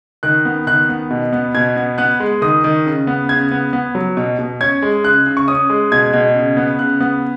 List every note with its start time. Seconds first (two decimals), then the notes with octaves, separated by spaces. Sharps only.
0.23 D#3 F#6
0.45 B3
0.67 D#3 F#6
0.89 B3
1.10 B2
1.33 B3
1.55 B2 G#6
1.77 B3
1.98 B3 F#6
2.20 G#3
2.42 D#3 D#6
2.64 D#3
2.86 C#3
3.07 B3
3.29 C#3 G#6
3.52 B3
3.73 B3
3.95 F#3
4.17 B2
4.39 B2
4.61 C#4 G#6
4.82 G#3
5.04 C#3 F#6
5.26 C#3
5.37 C#6
5.48 C#4 D#6
5.70 G#3
5.92 B2 G#6
6.13 B2
6.35 C#3
6.57 B3
6.79 C#3 F#6
7.01 B3